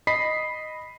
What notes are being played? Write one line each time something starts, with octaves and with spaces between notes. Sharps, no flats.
D#5 B5 B6 C7